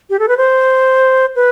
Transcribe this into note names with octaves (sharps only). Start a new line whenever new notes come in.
G4
A4
B4
C5
B4